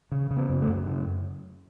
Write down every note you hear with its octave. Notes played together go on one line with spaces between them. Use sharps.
C#3
C#3
B3
F#2
A3
F#2
C#3